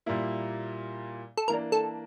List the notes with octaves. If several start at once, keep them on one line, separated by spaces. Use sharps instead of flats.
A#2 G3 A#3 E4
A4
E3 A#3 D4 A#4
A4